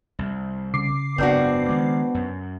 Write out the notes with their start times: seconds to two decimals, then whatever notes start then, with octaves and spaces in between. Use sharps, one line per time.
0.19 C2
0.74 C#3 D6 C7
1.18 F#1 G#2 B3 C4 D4 F#4
1.68 D#3 G#3
2.14 F#2